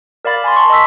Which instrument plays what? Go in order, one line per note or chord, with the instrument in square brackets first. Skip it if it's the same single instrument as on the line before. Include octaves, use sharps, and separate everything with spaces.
[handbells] A#4 D5 F5 B5 A6
G#5 B5 C6
A5 C6 C#6
D#5 A5 E6 B6